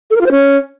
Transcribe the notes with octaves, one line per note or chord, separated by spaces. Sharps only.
A4
A#4
F4
C5
C#4